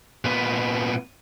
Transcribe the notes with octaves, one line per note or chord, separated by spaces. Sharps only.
A#2 B3